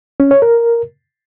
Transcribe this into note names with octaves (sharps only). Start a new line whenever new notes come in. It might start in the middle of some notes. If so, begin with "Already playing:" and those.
C#4
C#5
A#4